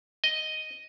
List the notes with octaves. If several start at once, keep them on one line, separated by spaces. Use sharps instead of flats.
D#5